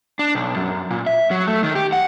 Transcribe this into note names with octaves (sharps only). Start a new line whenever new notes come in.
D4
B1
F#2
A#2
E5
F#3
A3
D#3
G4
F#5